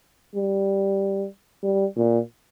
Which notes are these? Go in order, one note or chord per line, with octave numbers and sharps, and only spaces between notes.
G3
G3
A#2